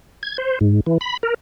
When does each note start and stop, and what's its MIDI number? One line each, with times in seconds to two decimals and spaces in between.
0.23 0.37 92
0.38 0.59 72
0.61 0.80 44
0.86 0.98 52
1.01 1.17 83
1.23 1.34 70